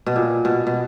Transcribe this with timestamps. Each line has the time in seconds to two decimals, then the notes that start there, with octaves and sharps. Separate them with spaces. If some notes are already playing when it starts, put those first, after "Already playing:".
0.06 B2
0.16 A#2
0.45 B2
0.67 B2